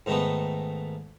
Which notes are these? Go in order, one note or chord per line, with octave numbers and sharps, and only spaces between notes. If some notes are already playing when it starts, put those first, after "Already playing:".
G#2 D#3 A3 B3